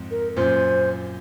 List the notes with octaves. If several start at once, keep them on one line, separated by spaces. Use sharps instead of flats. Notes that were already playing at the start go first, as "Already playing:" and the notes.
Already playing: F2 G#2
A#4
F#2 A#2 C5